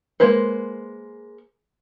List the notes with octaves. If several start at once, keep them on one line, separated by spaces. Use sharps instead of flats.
G#3 A#3 B4 C5